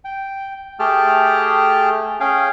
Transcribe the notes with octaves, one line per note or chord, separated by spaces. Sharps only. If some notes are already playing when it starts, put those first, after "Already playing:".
G5
A3 G4 G#4 G5 A5 F6
C#4 G#4 F5 G5 G#5